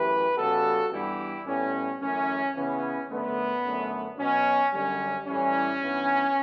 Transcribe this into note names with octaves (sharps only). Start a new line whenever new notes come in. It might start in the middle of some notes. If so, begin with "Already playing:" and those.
Already playing: F#2 E3 A3 G4 B4
C#3 G3 B3 F#4 A4
G2 E3 G3 B3 E4 G4
A2 G3 B3 C#4
F#2 E3 A3 C#4
C#3 E3 B3 C#4
F#2 D3 A3 B3
F#2 D3 A3
B2 F#3 B3 C#4
F#2 D3 G3 C#4
A2 E3 G3 C#4
G2 E3 B3